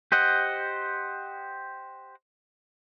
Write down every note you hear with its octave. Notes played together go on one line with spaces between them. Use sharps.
G4 C5 D#5 F#5